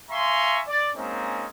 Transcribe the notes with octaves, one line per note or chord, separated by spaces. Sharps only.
E5 F5 G#5 A#5 C6 C#6
D5
G#3 A#3 C4 C#4 D#4 A#4